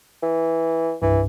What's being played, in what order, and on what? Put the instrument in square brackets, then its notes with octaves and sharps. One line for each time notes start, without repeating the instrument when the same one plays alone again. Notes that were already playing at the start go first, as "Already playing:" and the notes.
[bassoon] E3
[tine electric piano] C2 G2 [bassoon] E3